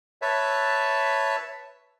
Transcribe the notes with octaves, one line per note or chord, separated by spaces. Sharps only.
B4 C#5 E5 A5